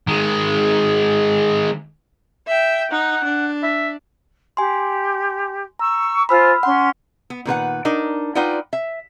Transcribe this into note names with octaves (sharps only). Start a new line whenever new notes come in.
D#3 G#3
E5 G5
D#4 F#5
D4
E5
G4 G#5 C6
A#5 C#6 E6
F4 C5 G#5 B5 E6 F6
C#4 F#5 C6
B3
A#2 D#3 B4 F#5
D4 D#4 A#4
D#4 F4 B4 D5 F#5 G5
E5